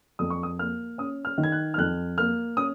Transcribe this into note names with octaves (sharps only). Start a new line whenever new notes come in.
F2 D#6
C#6
D#6
A#3 F6
C#4 D#6
F6
D#3
G#6
F#6
F6
F2 F#6
A#3 F6
C#4 D#6